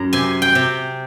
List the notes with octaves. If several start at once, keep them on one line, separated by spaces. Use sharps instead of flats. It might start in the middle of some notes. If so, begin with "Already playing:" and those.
Already playing: F#2 A#5
C3 G#5
G5
C3